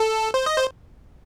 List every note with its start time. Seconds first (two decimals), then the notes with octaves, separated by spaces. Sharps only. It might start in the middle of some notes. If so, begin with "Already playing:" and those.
Already playing: A4
0.34 C5
0.46 D#5
0.57 C5